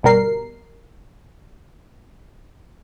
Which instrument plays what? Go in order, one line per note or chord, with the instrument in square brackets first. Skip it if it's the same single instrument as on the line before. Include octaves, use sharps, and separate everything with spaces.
[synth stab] G1 B2 G3 A#4 C7